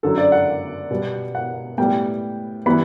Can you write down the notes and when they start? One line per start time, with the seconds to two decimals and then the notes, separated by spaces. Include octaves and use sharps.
0.03 F#2 D3 F#3 A4
0.18 D5
0.32 F#5
0.91 B2 G3 B3
1.35 F#5
1.78 A2 G3 B3 G5
2.66 E3 G3 B3 B5